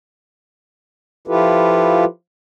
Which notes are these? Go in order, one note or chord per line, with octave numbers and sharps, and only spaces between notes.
F3 E4 F4 G4 A4 B4